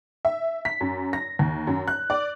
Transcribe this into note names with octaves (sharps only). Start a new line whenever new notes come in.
E5
B6
F#2
A#6
D#2
F#2
F#6
D5